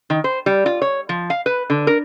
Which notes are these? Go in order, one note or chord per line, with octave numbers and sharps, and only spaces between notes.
D#3
C5
G3
F4
C#5
F3
F5
B4
D3
A#4